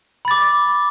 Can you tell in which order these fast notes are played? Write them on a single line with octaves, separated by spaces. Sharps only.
B5 A6 D6